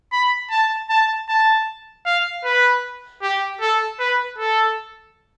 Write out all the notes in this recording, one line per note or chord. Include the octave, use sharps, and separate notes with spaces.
B5
A5
A5
A5
F5
B4
G4
A4
B4
A4